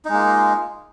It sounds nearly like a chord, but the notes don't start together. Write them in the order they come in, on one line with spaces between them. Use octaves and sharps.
D#4 G#3 A#3 F4